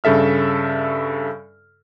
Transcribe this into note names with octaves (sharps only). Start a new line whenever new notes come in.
G2 C#3 A4 E5 F6